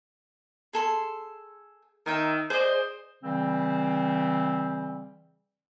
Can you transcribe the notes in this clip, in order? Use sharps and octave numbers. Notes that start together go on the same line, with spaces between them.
G#4 A4 C6
D#3 A#4 E5 G5
G#4 C5 D5 D#5
C#3 E3 G3 C4